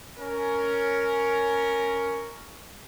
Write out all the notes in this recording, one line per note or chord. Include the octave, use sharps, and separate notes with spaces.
C#4 A#4